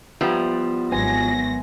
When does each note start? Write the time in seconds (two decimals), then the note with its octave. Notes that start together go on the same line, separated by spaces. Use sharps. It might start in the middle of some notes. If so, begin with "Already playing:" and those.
0.21 F3 G3 B3 E4
0.92 G#1 F#3 B3 G#5 C6 A#6